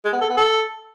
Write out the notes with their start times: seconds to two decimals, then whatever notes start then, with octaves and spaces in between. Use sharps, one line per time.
0.05 G#3
0.13 B3
0.21 A4
0.29 B3
0.37 A4